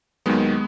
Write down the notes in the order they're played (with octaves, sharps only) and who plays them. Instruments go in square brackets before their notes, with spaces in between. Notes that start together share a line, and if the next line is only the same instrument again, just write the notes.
[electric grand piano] D#2 D#3 F#3 G#3 B3